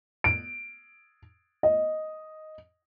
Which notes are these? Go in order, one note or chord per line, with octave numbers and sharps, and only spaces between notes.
D7
D#5